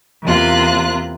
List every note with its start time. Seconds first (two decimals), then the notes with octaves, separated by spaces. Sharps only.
0.23 E2 C3 A#3 F4 F#6